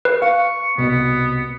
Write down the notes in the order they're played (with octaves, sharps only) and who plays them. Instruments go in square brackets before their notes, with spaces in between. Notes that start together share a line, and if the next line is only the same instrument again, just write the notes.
[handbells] B4
[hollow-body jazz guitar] F5 [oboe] C#6
[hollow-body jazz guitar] C2 B2 [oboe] B3